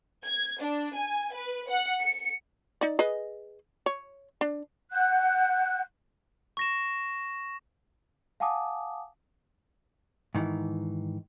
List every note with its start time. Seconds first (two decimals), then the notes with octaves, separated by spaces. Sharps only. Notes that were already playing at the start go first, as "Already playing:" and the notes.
0.25 G#6
0.60 D4
0.94 G#5
1.33 B4
1.69 F#5
2.01 C#7
2.81 D#4 D5
2.99 G#4 B4 D#5
3.86 C#5
4.41 D4
4.92 F#5 F#6 G6
6.57 C#6 A#6 E7
8.40 F5 F#5 G#5 A5 D6 D#6
10.35 G#2 D#3 E3